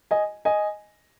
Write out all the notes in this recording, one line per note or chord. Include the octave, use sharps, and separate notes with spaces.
D#5 G#5
D#5 G#5